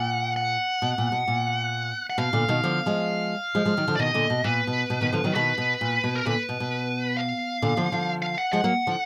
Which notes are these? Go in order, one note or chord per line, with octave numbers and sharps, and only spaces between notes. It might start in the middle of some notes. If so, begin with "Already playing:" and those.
Already playing: A#2 F#5
F#5
B2
A#2
B2
A#2
F#5
B2 F5
A#2 D3
B2 D#3
D3 F3
F3 G#3
F3 G#3
F3 G#3
D#3 F#3
D3 F3
D5
B2 D#3 D#5
A#2 D3
B2
A#2 B4
B2
B2
B2 D#3
D3 F3
D#3 F#3
B2 D#3 B4
B2
A#2
B2
A#4
A#2 D3 B4
B2
B2
F5
A#2 D3
D3 F3
D3 F3
F5
F#5
F3 G#3 F#5
F#3 A#3
D3 F3